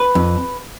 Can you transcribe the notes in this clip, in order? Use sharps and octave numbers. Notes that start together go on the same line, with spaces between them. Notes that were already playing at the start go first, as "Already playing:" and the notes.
Already playing: B4
F2